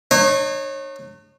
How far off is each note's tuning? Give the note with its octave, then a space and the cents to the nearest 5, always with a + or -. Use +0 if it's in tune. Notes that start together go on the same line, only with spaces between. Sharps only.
D#4 -45 C#5 -25